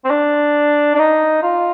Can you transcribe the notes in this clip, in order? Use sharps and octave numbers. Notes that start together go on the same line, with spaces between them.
C4
D4
D4
D#4
F4